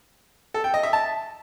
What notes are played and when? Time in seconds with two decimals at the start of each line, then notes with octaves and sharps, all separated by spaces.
0.54 A4
0.64 G5
0.74 D#5
0.83 E5
0.93 A5